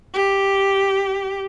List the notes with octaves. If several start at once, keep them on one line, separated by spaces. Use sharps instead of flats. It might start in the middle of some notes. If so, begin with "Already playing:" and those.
G4